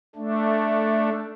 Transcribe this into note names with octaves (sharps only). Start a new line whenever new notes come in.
A3 D4